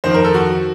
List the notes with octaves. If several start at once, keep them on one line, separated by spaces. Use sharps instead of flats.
F2 D#3 C5
A#4
A4
F#4